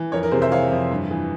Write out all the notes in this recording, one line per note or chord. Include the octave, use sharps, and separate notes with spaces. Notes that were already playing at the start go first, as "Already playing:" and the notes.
Already playing: E3
F2 A#4 C#5
A#4
C3 G#4 C5
C5 E5
E3 C#5 F5
F2
G2
E3